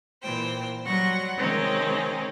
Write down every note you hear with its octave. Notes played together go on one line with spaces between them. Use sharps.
A#2 E3 C5 G5
F#3 G3 F#5 C6 C#6 A#6
C3 D#3 G#3 C4 C#4 D#4